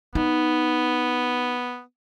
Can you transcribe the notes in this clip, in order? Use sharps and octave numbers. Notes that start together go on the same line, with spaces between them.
B3 D#4